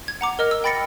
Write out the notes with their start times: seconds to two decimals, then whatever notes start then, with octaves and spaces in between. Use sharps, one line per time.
0.08 G#6
0.21 F#5 A#5 D6
0.39 A#4 D#5 F6
0.51 E6
0.64 G5 B5 A6 A#6 C#7